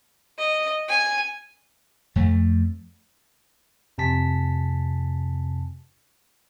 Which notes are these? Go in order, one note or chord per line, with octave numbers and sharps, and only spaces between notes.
D#5
G#5
F2 A3
F2 C3 G#5 A5 B6